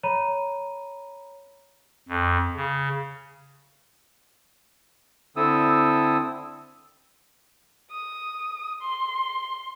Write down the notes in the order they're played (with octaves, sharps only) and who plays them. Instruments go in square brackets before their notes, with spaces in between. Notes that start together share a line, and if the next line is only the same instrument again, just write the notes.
[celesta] C#5 A#5 B5 D#7
[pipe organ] F2
C#3
[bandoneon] D3 C4 E4 A4 D#6 E6
[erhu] D#6
C6